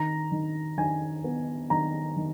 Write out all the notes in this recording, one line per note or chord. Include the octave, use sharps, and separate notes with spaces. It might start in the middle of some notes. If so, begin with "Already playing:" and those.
Already playing: D#3 A#5
D#3
D#3 G#5
B3
D#3 A#5
D#3